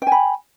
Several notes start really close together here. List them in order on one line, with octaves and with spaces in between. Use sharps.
G5 G#5 B5